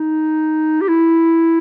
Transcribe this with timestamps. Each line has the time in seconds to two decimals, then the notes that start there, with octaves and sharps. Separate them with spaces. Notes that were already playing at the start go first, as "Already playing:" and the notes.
Already playing: D#4
0.81 G4
0.88 E4